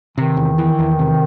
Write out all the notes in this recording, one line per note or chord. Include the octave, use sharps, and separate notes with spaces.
C3 D#3
E2
E3
E2
C3